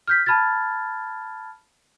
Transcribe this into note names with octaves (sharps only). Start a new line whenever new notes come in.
F6 G6 B6
A5 B5 F6 G#6 A6